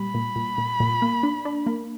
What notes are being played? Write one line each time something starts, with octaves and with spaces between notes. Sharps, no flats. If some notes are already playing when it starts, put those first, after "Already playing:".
Already playing: A#2 G3 B5
A#2
A#2
A#2
A#2
A#3
D4
D4
A#3